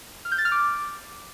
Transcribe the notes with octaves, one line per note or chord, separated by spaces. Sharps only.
F6
G6
A6
F6
D6